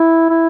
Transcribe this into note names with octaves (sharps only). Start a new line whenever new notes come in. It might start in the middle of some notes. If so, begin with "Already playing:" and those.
Already playing: E4
E4